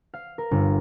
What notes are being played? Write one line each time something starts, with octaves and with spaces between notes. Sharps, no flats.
F5
A#4
G1